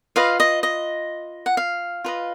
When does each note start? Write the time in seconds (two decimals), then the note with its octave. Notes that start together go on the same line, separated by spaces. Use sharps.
0.16 F4 B4 D#5 F5
0.40 D#5
0.63 D#5
1.46 F#5
1.57 F5
2.04 F4 B4 D#5